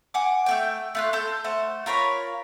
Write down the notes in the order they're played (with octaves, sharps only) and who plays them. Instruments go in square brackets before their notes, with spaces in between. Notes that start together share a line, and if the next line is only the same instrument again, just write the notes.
[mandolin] F#5 G#5 D6
A3 A#3 G5
A3 F4 F#6
A4 C6 G6
A3 C5 F#5
F4 A#4 C#5 B5